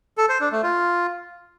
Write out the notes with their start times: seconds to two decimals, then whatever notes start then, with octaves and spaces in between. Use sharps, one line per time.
0.18 A4
0.29 C5
0.40 D4
0.52 A3
0.63 F4